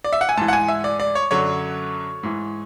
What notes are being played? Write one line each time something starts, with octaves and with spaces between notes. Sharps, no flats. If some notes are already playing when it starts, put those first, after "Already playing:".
D5
E5
F#5
G#5
G#2 E3 A5
F#5
G#5
E5
D5
D5
C#5
F#2 D3 F#3 C#5
G#2 E3